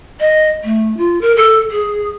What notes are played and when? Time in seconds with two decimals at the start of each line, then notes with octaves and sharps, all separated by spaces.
0.20 D#5
0.64 A3
0.97 F4
1.21 A#4
1.37 A4
1.71 G#4